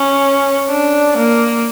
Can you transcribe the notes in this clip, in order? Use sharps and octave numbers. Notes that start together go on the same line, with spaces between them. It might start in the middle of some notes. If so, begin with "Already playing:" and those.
Already playing: C#4
D4
A#3